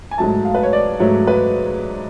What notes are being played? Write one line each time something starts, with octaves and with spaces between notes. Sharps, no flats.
G#5
G#2 F#3 A3 A5
F5
B4
C#5
D5
G#2 F#3 A3 C#5
B4